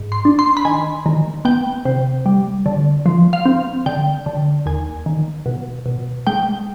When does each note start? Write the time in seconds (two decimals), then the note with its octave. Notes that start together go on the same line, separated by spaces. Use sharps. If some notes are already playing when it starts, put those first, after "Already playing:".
Already playing: G#2
0.12 C6
0.25 D4
0.39 C6
0.57 B5
0.65 D#3 G#5
1.06 D#3
1.45 B3 G5
1.85 C3
2.26 G3
2.66 D3
3.06 F3
3.33 F5
3.45 C4
3.86 D3 G5
4.26 D3
4.66 D#2 G#5
5.06 D#3
5.46 B2
5.86 B2
6.27 G#3 G5